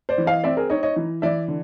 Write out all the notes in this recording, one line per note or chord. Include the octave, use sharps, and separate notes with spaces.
C5 D5
E3
D#5 F5
C4 D5 E5
G#4 A#4
D#4 C#5 D#5
C#5 D#5
E3
E3 D5 E5
D3